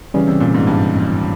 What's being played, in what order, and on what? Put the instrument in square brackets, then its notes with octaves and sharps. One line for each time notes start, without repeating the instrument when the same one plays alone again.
[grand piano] C#3 [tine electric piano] E3 G3 C#4
[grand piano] C3
A#2
G#2
G2
F2